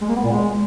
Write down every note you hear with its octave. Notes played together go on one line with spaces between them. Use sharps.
G#3
A#3
B3
A#2
G#3